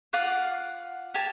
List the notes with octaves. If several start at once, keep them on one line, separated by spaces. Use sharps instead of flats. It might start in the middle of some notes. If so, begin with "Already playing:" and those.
F4 F5 F#5 D6
G4 G#5 A5